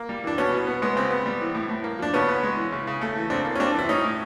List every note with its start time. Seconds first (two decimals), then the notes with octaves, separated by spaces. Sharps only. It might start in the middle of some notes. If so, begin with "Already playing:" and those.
Already playing: A#3
0.09 G3
0.24 E3 D4
0.38 B2 B3 C#4
0.52 B2
0.67 B3
0.82 G#3 B3
0.96 C#3 C4
1.11 B3
1.26 G3
1.41 E3
1.55 A2
1.69 A2
1.84 A#3
1.99 F3 D4
2.14 C#3 B3 C#4
2.28 B3
2.43 G#3
2.57 E3
2.72 C#3
2.87 C#3
3.01 A3
3.16 E3
3.30 C#3 C4 D4
3.45 A#3
3.56 C#4
3.60 G3 C4 D4
3.74 E3 E4
3.89 A2 C#4 D#4
4.04 A2